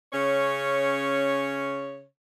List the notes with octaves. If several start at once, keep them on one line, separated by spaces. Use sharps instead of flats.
C#3 C#4 C#5